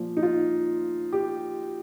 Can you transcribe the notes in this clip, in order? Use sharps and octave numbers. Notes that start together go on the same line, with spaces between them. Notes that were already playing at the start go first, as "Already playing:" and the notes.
Already playing: A#2 F3
D#4
F4
G4